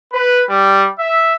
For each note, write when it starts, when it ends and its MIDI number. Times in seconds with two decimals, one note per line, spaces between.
0.13 0.41 71
0.49 0.87 55
0.99 1.33 76